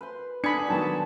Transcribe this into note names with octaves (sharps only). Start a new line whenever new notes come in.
B4 C5 C6
D3 D4 G#4 B5 G#6 C#7
D#3 F#3 B3 A5